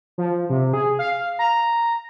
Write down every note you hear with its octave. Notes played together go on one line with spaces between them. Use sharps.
F3
C3
G#4
F5
A#5